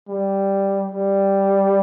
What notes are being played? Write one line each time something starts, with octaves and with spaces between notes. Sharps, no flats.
G3
G3